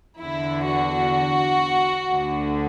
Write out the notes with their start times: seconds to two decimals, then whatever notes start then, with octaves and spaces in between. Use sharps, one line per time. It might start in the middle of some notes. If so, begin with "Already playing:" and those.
0.18 E2 D3 E4
0.66 F#4
2.10 D2 D3